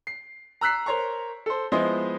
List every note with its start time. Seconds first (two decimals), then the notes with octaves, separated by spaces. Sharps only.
0.07 C7
0.61 A#5 E6 F#6 B6 C7
0.86 A#4 C5 C#5 A#5 C#6
1.46 A4 C5
1.72 F3 G#3 B3 E4 C5 D#5